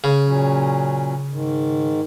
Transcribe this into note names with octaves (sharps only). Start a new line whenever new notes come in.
C#3
A#2 F#3 C#4
G#2 D#3